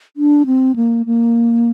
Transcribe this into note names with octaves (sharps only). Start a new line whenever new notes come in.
D4
C4
A#3
A#3